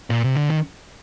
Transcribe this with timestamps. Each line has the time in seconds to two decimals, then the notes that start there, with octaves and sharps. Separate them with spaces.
0.10 A#2
0.23 C3
0.37 D3
0.50 D#3